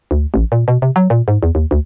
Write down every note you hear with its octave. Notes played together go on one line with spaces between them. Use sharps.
D2
A1
A#2
B2
C3
F#3
A#2
G#2
E2
D#2
D2